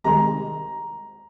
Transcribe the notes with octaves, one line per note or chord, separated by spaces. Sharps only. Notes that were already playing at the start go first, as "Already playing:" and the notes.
C2 C3 D#3 G#3 A#5